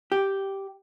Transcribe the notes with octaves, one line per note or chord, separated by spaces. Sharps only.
G4